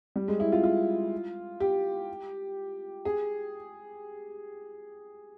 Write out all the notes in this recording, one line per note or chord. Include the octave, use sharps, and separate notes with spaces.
G3
G#3
E4
F4
F4
G4
G#4